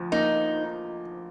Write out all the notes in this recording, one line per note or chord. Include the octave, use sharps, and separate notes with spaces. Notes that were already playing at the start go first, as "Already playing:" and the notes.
Already playing: D2 F3
A#3 D#4